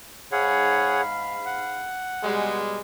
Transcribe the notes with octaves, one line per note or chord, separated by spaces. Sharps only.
G#2 G#4 C#5 F5 F#5 B5
F#5
B2 G3 G#3